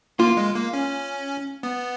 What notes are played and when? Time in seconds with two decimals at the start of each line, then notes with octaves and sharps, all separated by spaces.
0.19 A#3 F4
0.37 G#3
0.55 A#3
0.73 C#4
1.63 B3